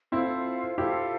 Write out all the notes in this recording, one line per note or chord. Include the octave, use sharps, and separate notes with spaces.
C4 E4 F4 A4 C5 F5
E4 F4 G4 A4 C5 F5